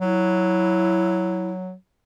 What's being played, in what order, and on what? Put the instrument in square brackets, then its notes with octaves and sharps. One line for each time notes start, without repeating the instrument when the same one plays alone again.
[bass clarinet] F#3 [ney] E4